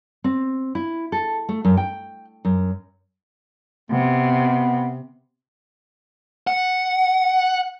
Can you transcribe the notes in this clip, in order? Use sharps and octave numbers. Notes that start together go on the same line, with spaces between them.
C4
E4
A4
A3
F#2
G5
F#2
C3 B3
F#5